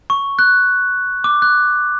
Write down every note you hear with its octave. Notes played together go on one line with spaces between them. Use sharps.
C#6
F#6
D6
F#6